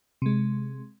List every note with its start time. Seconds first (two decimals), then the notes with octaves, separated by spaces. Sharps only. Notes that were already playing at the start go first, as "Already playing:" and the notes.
0.22 C3 G#3